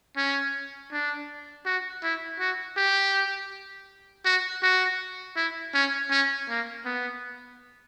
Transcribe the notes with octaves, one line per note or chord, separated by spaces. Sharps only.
C#4
D4
F#4
E4
F#4
G4
F#4
F#4
E4
C#4
C#4
A#3
B3